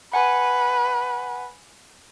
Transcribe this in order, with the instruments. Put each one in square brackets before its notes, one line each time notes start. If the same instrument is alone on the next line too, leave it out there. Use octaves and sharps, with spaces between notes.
[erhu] B4 [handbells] F#5 G#5